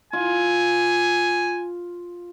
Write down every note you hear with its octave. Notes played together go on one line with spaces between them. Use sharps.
F4 G#5